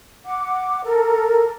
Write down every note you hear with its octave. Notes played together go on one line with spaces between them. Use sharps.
F#5 D6
A4 A#4